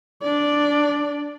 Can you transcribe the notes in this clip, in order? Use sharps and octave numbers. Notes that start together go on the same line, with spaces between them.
D4 D5